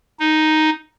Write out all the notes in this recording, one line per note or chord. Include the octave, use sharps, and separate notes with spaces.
D#4